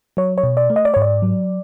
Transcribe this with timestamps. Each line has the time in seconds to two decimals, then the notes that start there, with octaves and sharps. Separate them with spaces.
0.17 F#3 C#5
0.38 C#5
0.43 B2
0.57 D5
0.70 A3
0.76 D#5
0.85 D5
0.94 G#2 C#5
1.02 D5
1.22 F#3